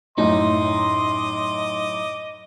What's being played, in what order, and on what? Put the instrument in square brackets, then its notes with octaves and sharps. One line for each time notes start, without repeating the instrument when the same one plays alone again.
[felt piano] F#2 A2 [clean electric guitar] D#4 [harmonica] D#5 D6 [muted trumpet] C6